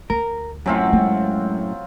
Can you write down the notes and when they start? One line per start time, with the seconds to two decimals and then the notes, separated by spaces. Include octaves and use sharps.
0.10 D2 A#4
0.66 F#2 A2 F#3 C4 F4
0.93 G#3